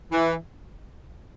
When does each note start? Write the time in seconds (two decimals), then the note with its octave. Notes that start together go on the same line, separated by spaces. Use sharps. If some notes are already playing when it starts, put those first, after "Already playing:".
0.12 E3